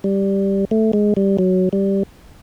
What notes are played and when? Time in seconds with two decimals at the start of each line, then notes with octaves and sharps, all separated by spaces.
0.04 G3
0.71 A3
0.93 G#3
1.17 G3
1.39 F#3
1.73 G3